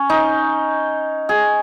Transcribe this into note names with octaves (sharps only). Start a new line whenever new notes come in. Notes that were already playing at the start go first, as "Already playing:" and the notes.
Already playing: C#4
D#4
G#4